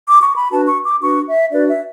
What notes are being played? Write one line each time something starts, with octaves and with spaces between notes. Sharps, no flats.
D6
C#6
B5
D4 F#4 B4 A5
C#6
D6
D4 F#4 B4 C#6
E5
D4 F#4 B4 D5
E5